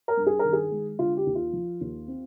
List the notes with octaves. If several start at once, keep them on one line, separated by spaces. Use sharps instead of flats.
A#4
G2
G#4
D#3 A#4
G#4
G#3
D3 F4
G4
D#2
F4
F3
D#2
C4